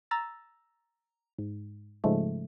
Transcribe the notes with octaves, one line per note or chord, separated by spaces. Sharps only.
A#5 E6 A6
G#2
G#2 C#3 F3 G#3 A3